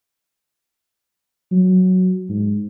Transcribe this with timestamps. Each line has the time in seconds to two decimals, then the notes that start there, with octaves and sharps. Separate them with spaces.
1.52 F#3
2.29 G#2